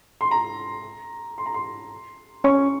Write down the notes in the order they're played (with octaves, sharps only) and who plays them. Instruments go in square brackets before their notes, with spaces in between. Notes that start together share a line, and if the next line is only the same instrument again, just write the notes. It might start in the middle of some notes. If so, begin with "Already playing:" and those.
[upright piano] C6
A#5
C6
A#5
C6
[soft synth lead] C#4 [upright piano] C#6